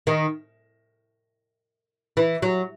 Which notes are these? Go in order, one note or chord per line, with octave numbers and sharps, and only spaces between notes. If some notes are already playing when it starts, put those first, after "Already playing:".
D#3
E3
F#3